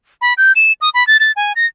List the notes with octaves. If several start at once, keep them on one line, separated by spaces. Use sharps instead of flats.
B5
G6
E7
D#6
B5
A6
A6
G#5
A#6